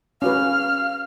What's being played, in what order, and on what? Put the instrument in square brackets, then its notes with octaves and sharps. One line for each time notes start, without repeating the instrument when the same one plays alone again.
[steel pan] C#4 F#4 B4 [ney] F5 [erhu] F6